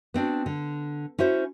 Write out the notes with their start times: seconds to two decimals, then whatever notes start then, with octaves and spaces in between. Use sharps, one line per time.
0.14 B3 C4 D4 F#4
0.46 D3
1.18 C#4 E4 F#4 C5